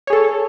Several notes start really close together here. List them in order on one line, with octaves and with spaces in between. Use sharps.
C#5 G#4 A4